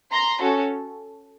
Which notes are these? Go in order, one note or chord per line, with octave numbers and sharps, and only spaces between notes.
A#5 C6
C#4 F#4 A4